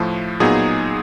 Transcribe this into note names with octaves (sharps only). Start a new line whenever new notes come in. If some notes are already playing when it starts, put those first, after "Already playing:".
Already playing: A2 F3 A3
A#2 F#3 B3 D#4 G#4